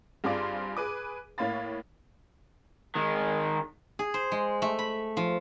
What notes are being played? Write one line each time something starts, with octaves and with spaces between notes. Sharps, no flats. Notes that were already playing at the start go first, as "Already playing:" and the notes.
G2 C4 F4 G#4 D5 D6
G#4 B4 D6
A2 A#3 C#5 F5 B5 A6
D#3 G#3
G#4
C5
G#3
A3
B5
F3